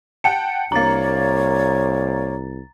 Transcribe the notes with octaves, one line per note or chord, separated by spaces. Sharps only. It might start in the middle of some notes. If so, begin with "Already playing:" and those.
F#5 G5 A5 C#7
C2 A#3 D4 C#5 A#5 A6